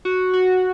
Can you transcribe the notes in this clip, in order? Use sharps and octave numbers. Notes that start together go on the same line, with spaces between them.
F#4
F#4